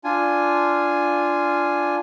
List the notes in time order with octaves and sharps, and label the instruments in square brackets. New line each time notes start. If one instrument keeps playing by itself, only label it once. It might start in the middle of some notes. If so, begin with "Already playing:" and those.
[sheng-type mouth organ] D4 F4 G#5